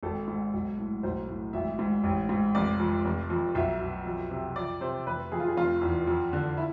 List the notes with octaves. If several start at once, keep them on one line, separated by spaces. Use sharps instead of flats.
G#1 A4
G#2
B1
A2
B1 C5
A2
G#1 E5
G#2
A1
G#2
F1 D5
F2
F1
F2
B1 E5
B2
F2
C3
F2 D5
C3 C5
F1 B4
F2 G#4
F4
G#4
F1 F4
E2
F2
D3
E4